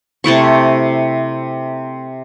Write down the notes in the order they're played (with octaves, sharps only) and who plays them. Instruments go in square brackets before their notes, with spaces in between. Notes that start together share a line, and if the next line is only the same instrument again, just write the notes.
[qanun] C3 A3 E4 C#6